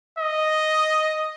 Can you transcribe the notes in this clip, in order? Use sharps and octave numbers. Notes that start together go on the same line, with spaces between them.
D#5